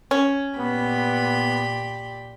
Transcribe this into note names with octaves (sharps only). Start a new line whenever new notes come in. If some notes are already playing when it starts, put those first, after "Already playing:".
C#4
A#2 B3 G4 B5